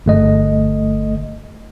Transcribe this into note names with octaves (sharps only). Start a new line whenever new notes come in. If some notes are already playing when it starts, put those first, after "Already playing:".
G1 A3 D#5